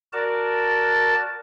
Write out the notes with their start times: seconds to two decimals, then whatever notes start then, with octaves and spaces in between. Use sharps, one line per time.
0.13 F#4 A#4 D5 A5